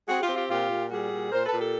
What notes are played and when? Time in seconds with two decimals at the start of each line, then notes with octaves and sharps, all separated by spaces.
0.09 C4 F#4 G#4
0.22 F4 G4
0.29 C4
0.36 F4 G4
0.50 A#2 F4 G4
0.70 A#2
0.91 G3 F#4 G#4
1.11 A#2
1.32 A#2 A#4 C5
1.46 A4 B4
1.53 A#2
1.60 G4 A4